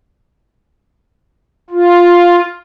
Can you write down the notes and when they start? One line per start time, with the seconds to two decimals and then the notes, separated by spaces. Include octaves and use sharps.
1.70 F4